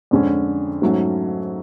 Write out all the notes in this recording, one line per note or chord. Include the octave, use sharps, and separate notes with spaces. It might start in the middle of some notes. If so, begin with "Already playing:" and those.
F2 D3 G#3 C#4
G#2 F#3 A3 C#4